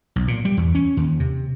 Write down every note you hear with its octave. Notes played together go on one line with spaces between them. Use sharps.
B1
A#2
G3
E2
C#4
D#2
C3